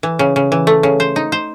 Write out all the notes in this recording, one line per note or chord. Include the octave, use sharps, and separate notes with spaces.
E3
C#3
C#3
E3
A3
C#3
C5
D#4
C5